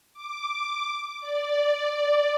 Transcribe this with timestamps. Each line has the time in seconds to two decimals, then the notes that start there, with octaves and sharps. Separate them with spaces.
0.14 D6
1.21 D5